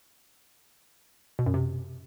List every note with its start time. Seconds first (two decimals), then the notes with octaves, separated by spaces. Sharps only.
1.39 B2
1.46 F#2
1.54 C3